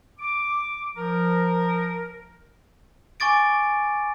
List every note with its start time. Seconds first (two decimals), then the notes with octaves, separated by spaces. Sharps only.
0.19 D6
0.97 F3 A#4
3.20 G#5 C#6 D6 A6 D7